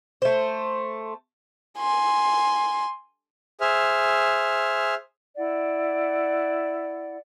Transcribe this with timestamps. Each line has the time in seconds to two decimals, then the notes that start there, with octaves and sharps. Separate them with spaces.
0.22 A3 C5
1.79 G#5 C6
3.61 G#4 C5 E5 F6
5.37 E4 D5 F#5